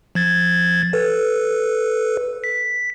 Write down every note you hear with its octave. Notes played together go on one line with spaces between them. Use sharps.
F3 G#6 A6
A4 B4
B6